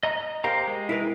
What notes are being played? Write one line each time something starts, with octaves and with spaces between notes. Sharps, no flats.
D#5 A#5
G4 A#4 C5 F5 A#5
G#3
E4 A#4 B4